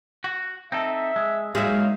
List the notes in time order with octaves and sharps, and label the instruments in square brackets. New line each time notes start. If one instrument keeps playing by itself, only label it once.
[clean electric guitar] F#4
[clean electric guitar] C4 D#4 A4 [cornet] E5
[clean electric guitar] G#3
[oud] F#3 G#3 [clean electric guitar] A#3 D#4 E5 [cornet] F5